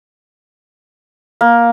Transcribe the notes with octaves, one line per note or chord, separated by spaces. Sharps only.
A#3